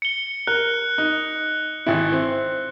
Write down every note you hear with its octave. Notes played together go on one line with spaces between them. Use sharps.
C#7 G7
A#4 F#6
D#4
G#1 E4
C4